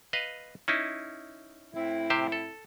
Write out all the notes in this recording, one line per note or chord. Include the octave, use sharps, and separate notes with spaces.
B4 D#5 F5
C#4 D#4 E4
A2 C4 E4
C3 G4 C5
A4